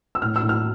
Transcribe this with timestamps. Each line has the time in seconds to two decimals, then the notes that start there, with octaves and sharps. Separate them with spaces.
0.15 E6
0.22 A2 F6
0.36 E6
0.42 A2
0.49 F6